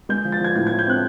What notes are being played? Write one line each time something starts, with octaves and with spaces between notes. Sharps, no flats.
G#3 G6
F3
A6
F3 G#6
A2 G#6
G#6
A2
G6
C4 F#6